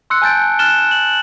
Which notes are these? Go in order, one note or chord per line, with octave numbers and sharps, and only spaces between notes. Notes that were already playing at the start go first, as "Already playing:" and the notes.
C6 E6 F#6 C#7
G#5 A5 G6 A6 D7
F6 F#6 A6 E7 G7
F#7